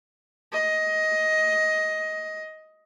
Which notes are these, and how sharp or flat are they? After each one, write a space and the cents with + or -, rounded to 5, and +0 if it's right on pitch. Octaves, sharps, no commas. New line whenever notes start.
D#5 +15